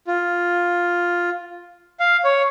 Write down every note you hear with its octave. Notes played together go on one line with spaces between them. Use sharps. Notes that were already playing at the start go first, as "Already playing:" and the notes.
F4
F5
C#5